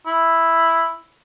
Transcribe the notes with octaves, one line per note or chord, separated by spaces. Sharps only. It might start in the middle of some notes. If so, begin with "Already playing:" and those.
E4